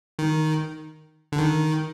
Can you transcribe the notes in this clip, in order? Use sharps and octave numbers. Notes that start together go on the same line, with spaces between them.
D#3
D3
D#3